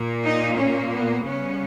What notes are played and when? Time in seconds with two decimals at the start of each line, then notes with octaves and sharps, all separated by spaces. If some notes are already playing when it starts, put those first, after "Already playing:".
Already playing: A#2 A#3
0.25 D#4
0.59 C#4
0.92 B3
1.25 C#3 G3 B3 C#4